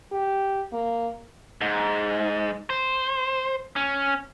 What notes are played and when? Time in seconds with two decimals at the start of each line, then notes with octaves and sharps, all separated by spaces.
0.12 G4
0.73 A#3
1.61 G#2
2.70 C5
3.76 C#4